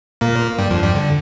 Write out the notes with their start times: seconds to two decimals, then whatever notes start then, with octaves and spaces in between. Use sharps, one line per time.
0.21 A#2 A#3
0.58 G2 G3
0.70 F2 F3
0.82 G2 G3
0.95 D3